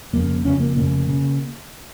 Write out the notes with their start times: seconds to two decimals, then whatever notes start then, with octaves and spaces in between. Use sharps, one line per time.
0.13 F1 F2 C#3 A#3
0.45 F1 F2 C#3 C#4
0.60 A#3
0.76 F1 F2 C#3 A#3
1.08 C#3